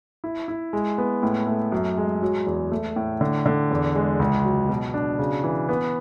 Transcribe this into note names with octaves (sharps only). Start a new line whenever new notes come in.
E4
E4
G#3
B3
A2
A3
F#2
G#3
F#3
E2
A3
A2
D3
D3
E2
G#3
C#2
F#3
B2
D4
C#3
E3
B3